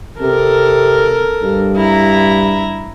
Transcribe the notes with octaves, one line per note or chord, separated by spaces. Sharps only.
C3 A4 A#4
G2
E4 A#5